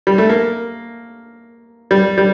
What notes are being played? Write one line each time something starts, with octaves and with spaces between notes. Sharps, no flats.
G3
A3
A#3
G3
G3